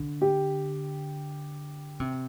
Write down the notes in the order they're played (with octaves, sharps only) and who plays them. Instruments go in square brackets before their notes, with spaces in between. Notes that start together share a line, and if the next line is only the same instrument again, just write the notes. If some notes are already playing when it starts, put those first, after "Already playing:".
Already playing: [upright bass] D3
[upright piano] G4
[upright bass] C3